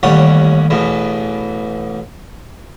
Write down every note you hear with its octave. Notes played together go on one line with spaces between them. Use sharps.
A1 D#2 G3 C#5 F#5
A1 E2 B2